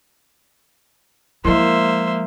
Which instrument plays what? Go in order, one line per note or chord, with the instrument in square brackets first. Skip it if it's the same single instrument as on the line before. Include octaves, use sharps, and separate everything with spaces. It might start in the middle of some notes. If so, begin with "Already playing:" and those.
[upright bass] F3 G#3 [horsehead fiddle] A#3 [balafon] E4 A#4 D#5 [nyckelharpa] C5 E5